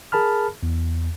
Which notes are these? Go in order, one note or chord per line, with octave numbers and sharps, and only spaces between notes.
G#4 A#4 A5 B5 F6
E2